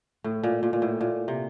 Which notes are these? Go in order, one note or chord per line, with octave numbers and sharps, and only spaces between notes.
A2
A#2
A#2
A#2
A2
A#2
C3